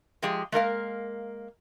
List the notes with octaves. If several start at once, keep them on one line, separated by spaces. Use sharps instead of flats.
F3 G#3 G4 G#4
G#3 A#3 A#4 F5